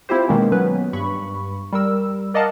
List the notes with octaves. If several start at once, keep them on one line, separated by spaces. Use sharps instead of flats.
C4 E4 F4 G4 C5
B2 D#3 G#3 A#3 C#4
F#3 B3 C#4 B4
G2 B5 C#6
G3 A#4 E6
A#4 D5 D#5 F5 F#5 A5